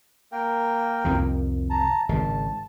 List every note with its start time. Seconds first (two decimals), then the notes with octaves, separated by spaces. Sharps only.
0.32 A#3 A#4 G5
1.05 C2 F2 D#3
1.70 A5 A#5
2.09 G#1 C#3 A5